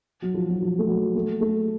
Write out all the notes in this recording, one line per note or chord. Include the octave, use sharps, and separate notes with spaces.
F#3
F3
F#3
F3
A3
F#3
A3
A3